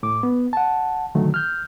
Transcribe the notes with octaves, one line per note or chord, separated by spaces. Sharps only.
A2 D6
B3
F#5 A5
A#2 D3 D#3 F#3 A3
F6 G6